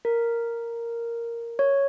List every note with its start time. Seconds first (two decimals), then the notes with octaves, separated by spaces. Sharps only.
0.05 A#4
1.59 C#5